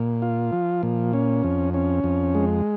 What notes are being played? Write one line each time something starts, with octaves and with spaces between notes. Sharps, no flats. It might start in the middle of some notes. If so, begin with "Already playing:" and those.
Already playing: A#2
F4
F3
A#2
C#4
F2
C#4
F2
G#3